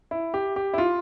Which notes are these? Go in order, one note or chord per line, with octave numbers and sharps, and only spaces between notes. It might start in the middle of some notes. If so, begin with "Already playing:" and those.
E4
G4
G4
E4
F4